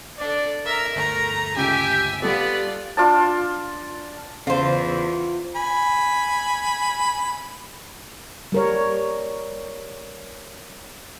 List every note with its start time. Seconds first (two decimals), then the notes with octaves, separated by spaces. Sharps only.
0.18 D4 A4 D5
0.66 A#4 E5 A#5
0.96 G1 D2 A3 A#5
1.57 C#2 G4 E5 G#5 D7
2.22 G3 B3 F4 A4 D5
2.97 D4 F4 D5 A5
4.47 E2 C#3 F4 C5
5.56 G#5 B5
8.52 G3 A#4 C#5